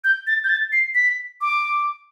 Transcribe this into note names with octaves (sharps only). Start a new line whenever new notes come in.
G6
A6
G6
A6
C7
B6
D6